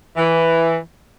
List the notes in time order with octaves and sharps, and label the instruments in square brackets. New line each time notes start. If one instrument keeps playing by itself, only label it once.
[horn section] E3